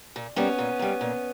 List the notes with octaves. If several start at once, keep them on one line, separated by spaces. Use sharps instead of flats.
A#2
G3 A#3 B3 C#4
A#2
G3 A#3
A#2